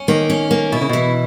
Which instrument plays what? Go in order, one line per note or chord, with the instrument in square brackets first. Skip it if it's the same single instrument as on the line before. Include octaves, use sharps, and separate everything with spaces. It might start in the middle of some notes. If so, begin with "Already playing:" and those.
Already playing: [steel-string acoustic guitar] C#4
[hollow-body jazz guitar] D#3 [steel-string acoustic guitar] A#3
[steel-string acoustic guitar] C#4
A#3
[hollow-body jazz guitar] B2 [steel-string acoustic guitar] E4
[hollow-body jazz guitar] C#3
[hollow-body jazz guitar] B2 [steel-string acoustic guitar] E3